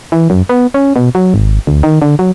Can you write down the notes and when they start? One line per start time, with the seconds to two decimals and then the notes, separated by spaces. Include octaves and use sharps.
0.12 E3
0.30 F#2
0.49 B3
0.74 C#4
0.96 B2
1.15 F#3
1.34 G#1
1.67 D2
1.83 D#3
2.02 D3
2.19 F#3